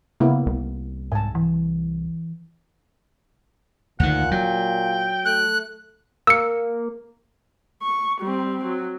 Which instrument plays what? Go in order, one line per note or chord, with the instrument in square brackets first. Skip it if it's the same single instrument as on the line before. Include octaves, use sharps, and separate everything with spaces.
[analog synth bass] C#3 [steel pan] A#3 B3 E4
[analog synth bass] C2
[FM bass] G#2 [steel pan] G#5 A5
[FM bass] E3
[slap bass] D2 D#3 [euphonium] A#2 [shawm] F#5
[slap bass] F#3 [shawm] G5
[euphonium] A3 [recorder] F#6
[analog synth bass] A#3 [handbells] E6 C#7
[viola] C#6
G3 C4
F#3